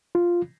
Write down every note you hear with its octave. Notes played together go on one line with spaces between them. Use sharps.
F4